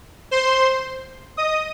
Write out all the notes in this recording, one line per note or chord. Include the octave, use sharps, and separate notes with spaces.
C5 C6
D#5 D#6